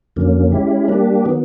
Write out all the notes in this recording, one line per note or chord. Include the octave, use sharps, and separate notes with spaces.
F2 D3 F#3 A#3 C#4
G#3 C#4 E4 G4
G3 A#3 D4 G4
D#3 F#3 B3